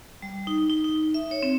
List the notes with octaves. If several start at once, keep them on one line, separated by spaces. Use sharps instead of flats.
G3
D#4
D#4
D#4
E5
C#5
C4